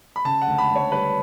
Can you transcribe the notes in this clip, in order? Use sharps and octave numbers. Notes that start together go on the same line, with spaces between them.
B5
C#3 A5
F#5
D2
B5
D2
C#5
G3 B4